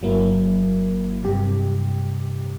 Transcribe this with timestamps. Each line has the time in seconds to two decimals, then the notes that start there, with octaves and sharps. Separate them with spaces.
0.01 G1 F#3 A#3 E4
1.23 G2 C3 G4